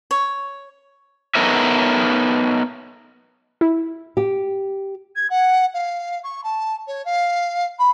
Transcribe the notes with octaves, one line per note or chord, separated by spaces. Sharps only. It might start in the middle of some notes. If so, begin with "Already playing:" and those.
C#5
B3 D#4 A4 A#4 C#5 E5
E4
G4
G#6
F#5
F5
C#6
A5
C#5
F5
B5